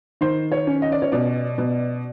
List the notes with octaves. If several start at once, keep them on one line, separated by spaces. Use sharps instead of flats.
D#3 C5
C#5
C#4
D#5
D5
C#5
B2 D5
B2